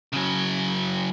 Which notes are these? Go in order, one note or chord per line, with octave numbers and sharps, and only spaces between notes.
C#3 F#3